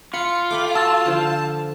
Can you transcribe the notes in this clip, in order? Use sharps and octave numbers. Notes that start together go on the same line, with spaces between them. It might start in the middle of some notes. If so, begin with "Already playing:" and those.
F4 B5 C#7
A3 G5 B5 D6
F#4 A5 E6 A6
D3 F3